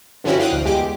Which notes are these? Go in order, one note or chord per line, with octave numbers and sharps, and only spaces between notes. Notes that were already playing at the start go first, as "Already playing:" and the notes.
G2 D3 F3 C#4 E4 F#4
F5 G5 D#6 F#6
D2
E2 G#3 G4 D6